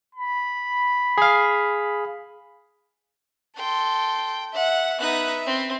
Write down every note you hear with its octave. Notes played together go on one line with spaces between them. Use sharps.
B5
G#4 F5
A4 G5 C6
E5 F#5
B3 D#4 E5 F#6
C4